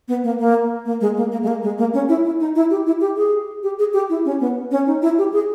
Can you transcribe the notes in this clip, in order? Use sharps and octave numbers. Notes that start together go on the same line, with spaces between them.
B3
A#3
A#3
A#3
G#3
A#3
A#3
G#3
A#3
G#3
A#3
C#4
E4
E4
D#4
E4
G4
E4
G4
G#4
G4
G#4
G4
E4
C#4
B3
C#4
D#4
E4
G4
G#4